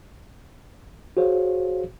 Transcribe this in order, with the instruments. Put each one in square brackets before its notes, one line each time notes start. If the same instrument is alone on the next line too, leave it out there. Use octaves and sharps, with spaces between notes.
[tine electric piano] F#4 G#4 C5 C#5 F5